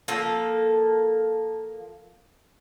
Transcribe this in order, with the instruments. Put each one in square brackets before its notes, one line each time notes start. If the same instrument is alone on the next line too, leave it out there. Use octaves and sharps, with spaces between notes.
[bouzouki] F3 A#3 A4